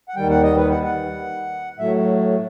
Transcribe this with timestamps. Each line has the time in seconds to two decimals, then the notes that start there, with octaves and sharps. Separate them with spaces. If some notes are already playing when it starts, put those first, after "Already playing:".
0.09 F#5
0.16 D#2 D#3 G3 G5
0.30 F#5
0.43 D#5
0.56 B4
0.71 F#5
0.84 F#5
1.78 A2 F#3 A3 E5